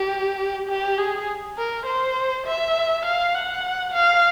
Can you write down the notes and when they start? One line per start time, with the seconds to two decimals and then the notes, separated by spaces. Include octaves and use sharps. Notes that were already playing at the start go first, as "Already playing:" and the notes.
Already playing: G4
0.68 G4
0.98 G#4
1.58 A#4
1.86 C5
2.46 E5
3.05 F5
3.35 F#5
3.94 F5